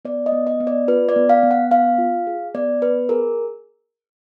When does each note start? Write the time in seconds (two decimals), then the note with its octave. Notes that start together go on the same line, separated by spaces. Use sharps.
0.05 B3 D5
0.26 D#5
0.32 B3
0.47 D#5
0.60 B3
0.67 D5
0.88 F4 B4
1.09 D5
1.16 B3
1.29 F5
1.43 B3
1.51 F#5
1.71 B3 F5
1.98 F4
2.27 G#4
2.54 B3 D5
2.82 B3 B4
3.09 G#4 A#4